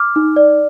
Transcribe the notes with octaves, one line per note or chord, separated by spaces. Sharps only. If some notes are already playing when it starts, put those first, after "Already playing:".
Already playing: D6 F6
D#4
D5